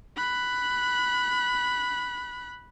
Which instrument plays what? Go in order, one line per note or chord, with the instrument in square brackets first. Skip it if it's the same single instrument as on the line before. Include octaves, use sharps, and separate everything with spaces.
[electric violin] B5 F#6